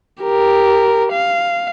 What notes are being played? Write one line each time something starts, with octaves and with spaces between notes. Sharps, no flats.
G4 A#4
F5